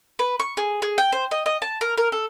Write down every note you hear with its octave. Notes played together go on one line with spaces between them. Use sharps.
B4
C#6
G#4
G#4
G5
C5
D#5
D#5
A5
A#4
A#4
A4